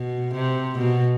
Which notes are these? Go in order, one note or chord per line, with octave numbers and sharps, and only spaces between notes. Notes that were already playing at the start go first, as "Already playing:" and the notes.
Already playing: B2
C3
B2